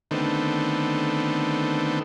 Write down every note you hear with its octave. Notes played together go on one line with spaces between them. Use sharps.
D3 D#3 A3 B3 C4